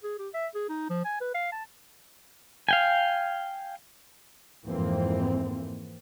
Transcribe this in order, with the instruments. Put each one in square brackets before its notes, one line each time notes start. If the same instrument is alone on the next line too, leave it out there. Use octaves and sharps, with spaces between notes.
[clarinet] G#4
G4
E5
G#4
D#4
F3
G#5
B4
F5
A5
[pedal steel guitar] F5 G5 G#5
[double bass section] F2 G#2 E3 A#3 C4